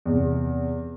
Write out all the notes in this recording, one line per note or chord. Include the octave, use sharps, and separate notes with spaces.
E2 C3